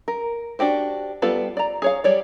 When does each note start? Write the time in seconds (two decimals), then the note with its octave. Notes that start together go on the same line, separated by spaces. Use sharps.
0.08 A#4
0.59 D4 F#4 G4 C5
1.22 G3 B3 F4 A4 B4
1.57 D5 A#5
1.82 G#4 C#5 F5
2.04 G3 C#5 D5